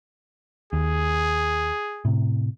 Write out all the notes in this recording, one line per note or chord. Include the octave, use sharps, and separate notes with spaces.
D#2 G#4
A2 C3